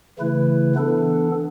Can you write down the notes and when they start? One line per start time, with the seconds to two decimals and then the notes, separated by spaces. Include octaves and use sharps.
0.19 C#3 E3 A3 E4 B4
0.75 E3 B3 D4 A4